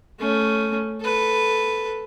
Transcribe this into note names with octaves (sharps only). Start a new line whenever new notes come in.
A3 C#4
A4 B4